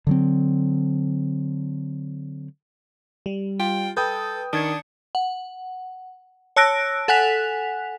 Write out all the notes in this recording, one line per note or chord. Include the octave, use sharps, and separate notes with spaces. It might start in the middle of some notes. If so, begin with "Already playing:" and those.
D3 F#3 C4
G3
F4 G5
A4 B4 G5 D#6 G6
D#3 D4 D#6 G#6 C#7
F#5
C#5 A5 E6 F#6 A#6 D7
A4 F#5 G#5 F#6 B6 F7